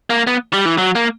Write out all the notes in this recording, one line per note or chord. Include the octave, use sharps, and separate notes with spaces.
A#3
B3
G3
E3
F#3
A#3